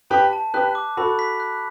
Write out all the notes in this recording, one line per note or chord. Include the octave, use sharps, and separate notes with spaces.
G4 B4 A5
A5
G4 B4 F#6
D6
F#4 A4 B5
B6
F#6